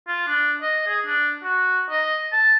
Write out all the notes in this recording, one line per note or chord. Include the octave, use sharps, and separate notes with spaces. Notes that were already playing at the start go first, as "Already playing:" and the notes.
F4
D4
D#5
G#4
D4
F#4
D#5
A5